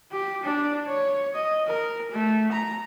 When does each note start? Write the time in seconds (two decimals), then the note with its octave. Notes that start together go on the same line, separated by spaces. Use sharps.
0.12 G4
0.43 D4
0.87 C#5
1.34 D#5
1.67 A#4
2.12 A3
2.52 A#5